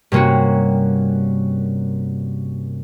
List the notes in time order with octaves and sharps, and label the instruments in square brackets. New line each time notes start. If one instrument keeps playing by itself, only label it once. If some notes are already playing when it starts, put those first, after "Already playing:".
[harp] G2 C3 A#3 C#4 F#4